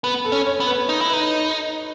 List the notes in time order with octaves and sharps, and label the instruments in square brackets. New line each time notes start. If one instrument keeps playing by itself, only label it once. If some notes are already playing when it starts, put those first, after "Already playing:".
[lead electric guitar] B3 [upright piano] B4
[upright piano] A4
[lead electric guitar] C#4
[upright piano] C#5
[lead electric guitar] B3
[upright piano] B4
[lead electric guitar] D#4
E4
[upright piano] B4
[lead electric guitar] D#4